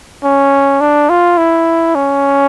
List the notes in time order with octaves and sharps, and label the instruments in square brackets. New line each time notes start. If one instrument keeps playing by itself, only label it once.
[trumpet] C#4
D4
F4
E4
C#4